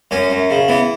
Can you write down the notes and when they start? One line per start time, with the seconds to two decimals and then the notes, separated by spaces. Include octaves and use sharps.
0.11 F#2 C#4
0.30 F#2
0.50 C#3
0.68 E3 B3